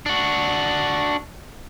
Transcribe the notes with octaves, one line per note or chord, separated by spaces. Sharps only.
D4 F#4